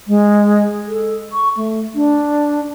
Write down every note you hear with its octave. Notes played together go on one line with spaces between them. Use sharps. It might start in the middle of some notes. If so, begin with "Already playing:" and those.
G#3
A4
C#6
A3
D4